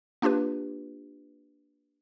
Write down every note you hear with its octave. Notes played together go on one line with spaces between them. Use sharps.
A#3 D4 F4 G4 B4